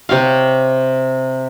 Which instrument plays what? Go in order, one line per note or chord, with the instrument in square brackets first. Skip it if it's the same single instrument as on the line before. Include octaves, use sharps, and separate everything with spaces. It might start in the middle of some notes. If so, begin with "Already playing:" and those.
[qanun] C3 G4 C#5 F5